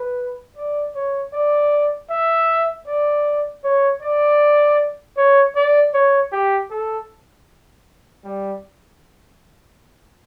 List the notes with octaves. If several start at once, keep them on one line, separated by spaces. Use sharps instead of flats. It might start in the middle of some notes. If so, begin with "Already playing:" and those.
Already playing: B4
D5
C#5
D5
E5
D5
C#5
D5
C#5
D5
C#5
G4
A4
G3